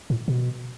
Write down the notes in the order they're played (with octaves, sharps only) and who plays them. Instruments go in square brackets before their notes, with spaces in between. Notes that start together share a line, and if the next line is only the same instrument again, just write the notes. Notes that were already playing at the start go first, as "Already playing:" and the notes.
[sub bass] A2
B2